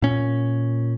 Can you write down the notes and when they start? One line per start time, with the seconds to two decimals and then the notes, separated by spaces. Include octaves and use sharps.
0.02 A#2 C#4